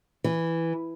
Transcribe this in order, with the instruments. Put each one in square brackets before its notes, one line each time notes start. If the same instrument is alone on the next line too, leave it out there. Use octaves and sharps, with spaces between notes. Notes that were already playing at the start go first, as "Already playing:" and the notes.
[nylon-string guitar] E3